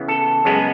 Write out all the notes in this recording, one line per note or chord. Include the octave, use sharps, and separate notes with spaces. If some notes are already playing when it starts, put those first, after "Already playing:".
Already playing: C#3 E3 B3
A4
F#2 C#3 G#3 B3